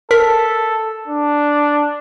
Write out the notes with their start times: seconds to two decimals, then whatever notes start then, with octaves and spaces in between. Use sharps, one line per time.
0.11 A4 A#4 B6
1.08 D4